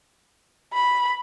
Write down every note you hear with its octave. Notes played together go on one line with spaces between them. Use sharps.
B5